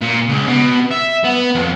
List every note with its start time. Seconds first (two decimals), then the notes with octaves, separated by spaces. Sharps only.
0.01 A#2
0.29 C#2
0.47 B2
0.91 E5
1.24 B3
1.55 F2